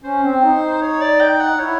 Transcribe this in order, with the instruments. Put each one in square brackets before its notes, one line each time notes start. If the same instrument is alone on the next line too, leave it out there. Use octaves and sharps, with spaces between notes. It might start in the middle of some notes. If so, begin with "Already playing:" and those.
[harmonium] C#4 [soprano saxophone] C5
[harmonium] C4
D#4
[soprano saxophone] C#5
D5
G5
F#5
[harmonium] E4 [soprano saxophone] C#5